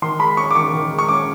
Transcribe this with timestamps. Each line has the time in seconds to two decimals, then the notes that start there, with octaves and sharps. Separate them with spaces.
0.02 D#3 C6
0.19 G#3 B5
0.37 C#4 C#6
0.51 D6
0.55 D#3 C#6
0.73 D#3
0.91 G#3
0.99 C#6
1.08 C#4 D6